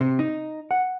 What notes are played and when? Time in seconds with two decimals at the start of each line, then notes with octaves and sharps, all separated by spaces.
0.01 C3
0.19 D#4
0.71 F#5